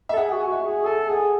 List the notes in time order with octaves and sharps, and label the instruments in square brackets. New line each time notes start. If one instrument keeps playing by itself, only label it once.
[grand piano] E5
[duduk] A4
[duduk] G#4 [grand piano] F#5
[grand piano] F#5
[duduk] F#4
[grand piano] G#5
[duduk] F#4 [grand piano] E5
[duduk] G#4
[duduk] A4 [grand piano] G#5
[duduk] G#4 [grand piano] F#5